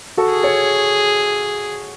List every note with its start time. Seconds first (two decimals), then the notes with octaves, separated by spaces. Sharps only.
0.17 F#4 A4
0.31 G#4
0.43 A4 C#5